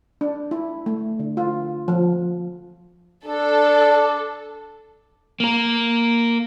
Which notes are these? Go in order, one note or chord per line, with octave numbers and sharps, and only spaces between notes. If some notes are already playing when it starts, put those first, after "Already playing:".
D4
E4
A3
D3
F4
F3
D4 A4
A#3 A#4